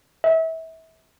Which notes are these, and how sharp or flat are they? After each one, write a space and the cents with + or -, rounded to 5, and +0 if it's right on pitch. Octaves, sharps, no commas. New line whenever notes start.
E5 -30